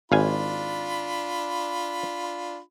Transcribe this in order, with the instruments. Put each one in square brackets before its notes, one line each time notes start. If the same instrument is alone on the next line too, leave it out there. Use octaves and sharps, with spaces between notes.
[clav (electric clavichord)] G#1 F5 G#5 [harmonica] D4 F4 B5